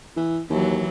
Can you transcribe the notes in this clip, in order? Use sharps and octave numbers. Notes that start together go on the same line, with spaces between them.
E3
D#2 E3 F#3